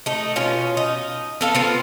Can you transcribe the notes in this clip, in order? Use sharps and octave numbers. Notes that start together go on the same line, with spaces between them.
A3 D#4
B2 C#4 F4
D#4
B3 A4 F5
B3 C4 F4